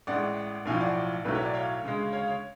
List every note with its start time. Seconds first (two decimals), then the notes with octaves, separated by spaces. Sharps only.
0.07 A1 A2 G#3 D5 F#5
0.66 B1 A2 F3 F5 G#5
0.80 D5 F#5
1.25 B1 A2 F#3 A3 B4
1.35 C#5
1.45 D5
1.54 C#5 F5
1.84 D2 C#3 G#3
2.12 C#5 F5
2.28 C#5